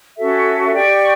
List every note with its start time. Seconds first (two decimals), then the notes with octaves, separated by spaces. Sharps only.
0.16 C#4 F#4 A4 E5
0.73 G4 D5 G5 C#6